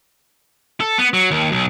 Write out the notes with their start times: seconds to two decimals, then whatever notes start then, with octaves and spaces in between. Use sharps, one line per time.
0.80 A4
0.98 B3
1.13 F#3
1.31 D#2
1.52 B1